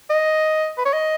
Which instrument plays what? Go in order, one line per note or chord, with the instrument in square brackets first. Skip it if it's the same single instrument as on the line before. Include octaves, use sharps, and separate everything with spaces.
[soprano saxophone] D#5
B4
C#5
D#5